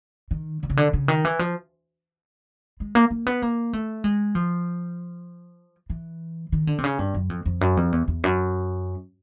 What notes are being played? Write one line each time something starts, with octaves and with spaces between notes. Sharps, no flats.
D#3
D3
C#3
D3
C#3
D#3
E3
F3
G#3
A#3
A#3
B3
A#3
A3
G#3
F3
E3
D#3
D3
C3
C#3
G2
F#2
F2
F2
F#2
F2
E2
E2
F#2